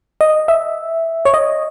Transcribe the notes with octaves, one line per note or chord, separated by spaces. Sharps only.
D#5
E5
C#5
D#5